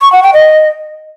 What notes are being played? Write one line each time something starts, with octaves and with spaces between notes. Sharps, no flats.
C#6
F#5
G5
D#5